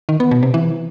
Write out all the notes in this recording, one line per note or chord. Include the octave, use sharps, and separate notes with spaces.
D#3
B3
B2
C3
E3